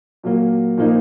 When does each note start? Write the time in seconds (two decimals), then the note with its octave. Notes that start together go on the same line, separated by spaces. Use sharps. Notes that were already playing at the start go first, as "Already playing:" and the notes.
0.23 A#2 F#3 A#3
0.78 A#2 F3 A#3 D#4